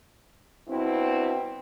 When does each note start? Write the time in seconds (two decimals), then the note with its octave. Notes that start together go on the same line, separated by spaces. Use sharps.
0.68 G2 B2 C4 E4